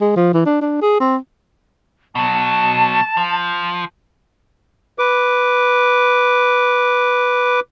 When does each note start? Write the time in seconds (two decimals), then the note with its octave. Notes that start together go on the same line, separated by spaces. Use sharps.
0.01 G#3
0.16 F3
0.34 E3
0.46 D4
0.61 D4
0.82 G#4
1.00 C4
2.15 B2 F#3 A5
3.17 F3
4.99 B4 D6